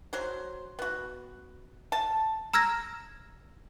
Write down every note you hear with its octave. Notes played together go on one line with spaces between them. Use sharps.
F#3 C5
B3 F#4
A5
A#5 E6 F6 G#6 A#6